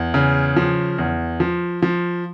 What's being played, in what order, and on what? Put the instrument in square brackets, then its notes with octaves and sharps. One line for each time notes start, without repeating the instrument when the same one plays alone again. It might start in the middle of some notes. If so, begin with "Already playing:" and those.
Already playing: [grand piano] E2
C#3
F3
E2
F3
F3